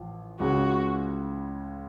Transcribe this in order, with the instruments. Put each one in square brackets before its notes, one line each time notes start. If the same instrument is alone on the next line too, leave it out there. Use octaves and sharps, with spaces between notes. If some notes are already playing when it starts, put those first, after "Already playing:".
Already playing: [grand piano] A1 F3
[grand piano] C#2 C#3 G#3 C#4 [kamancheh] F#4